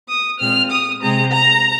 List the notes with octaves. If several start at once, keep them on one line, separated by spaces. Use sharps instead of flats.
D#6
A#2 G#3 C4 F6
D#6
C3 G#3 C4 A#5
A#5